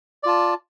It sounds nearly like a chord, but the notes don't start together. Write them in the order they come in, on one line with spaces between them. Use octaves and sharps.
D5 F4 A5